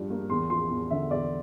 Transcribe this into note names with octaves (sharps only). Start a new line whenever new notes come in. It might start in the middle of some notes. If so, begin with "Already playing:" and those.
Already playing: G2 F3 D4
A#3
E2 C6
F3 C6
E2
D3 E5
E2 D5